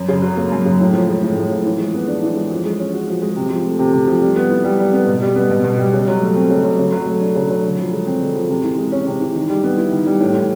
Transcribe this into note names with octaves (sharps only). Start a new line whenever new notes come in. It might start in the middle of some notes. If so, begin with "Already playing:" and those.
Already playing: F#2
C#3
F#3
A#3
F#2
C#3
A2
F3
G#3
A2
A2
F3
E3
G#3
B3
D4
E3
G#3
F3
G#3
C#4
F#4
F3
G#3
C3
F3
A3
C3
C3
F3
G3
B3
E4
G3
G3
B3
B2
G3
B3
B2
B2
G3
C#3
F#3
A3
C4
C#3
F#3
C#3
F#3
A3
D4
C#3
F#3
D3
F3
G#3
C4
D3
F3
C3
E3
G#3
C#4
C3
E3
D#3
G3
B3
E4
D#3
G3
A2
E3